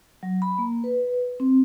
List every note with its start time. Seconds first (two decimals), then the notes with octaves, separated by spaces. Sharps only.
0.23 F#3
0.42 B5
0.58 A#3
0.84 B4
1.40 C4